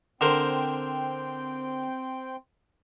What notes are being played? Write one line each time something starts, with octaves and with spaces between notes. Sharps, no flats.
D3 C4 A#4 C5 G5